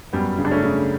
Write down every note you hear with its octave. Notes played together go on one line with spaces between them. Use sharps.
F#2 G3 B3
C#3
D4
A3 C#4
C#3